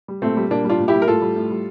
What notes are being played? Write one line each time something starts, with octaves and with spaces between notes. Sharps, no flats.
G3
A#2 A3 C4
G3
A#2 A#3 D4
G3
D4 F4
A#2
E4 G4
G3
A#4
A2 F4 A4
G3
A2
G3